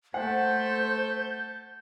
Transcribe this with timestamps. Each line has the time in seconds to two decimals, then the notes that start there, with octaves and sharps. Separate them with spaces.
0.14 A3 A4 C5 F#5 G6